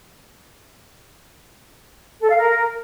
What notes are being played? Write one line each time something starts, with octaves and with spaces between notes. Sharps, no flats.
A4
F5
A#4